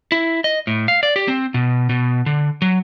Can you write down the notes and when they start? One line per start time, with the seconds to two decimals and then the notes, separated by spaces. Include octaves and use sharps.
0.12 E4
0.44 D#5
0.67 A2
0.88 F5
1.03 D5
1.16 G4
1.28 C4
1.54 B2
1.89 B2
2.26 D3
2.62 F#3